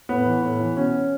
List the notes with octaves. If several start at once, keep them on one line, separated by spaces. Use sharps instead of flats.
A2 B3
E3
A2
E3
B2 C#4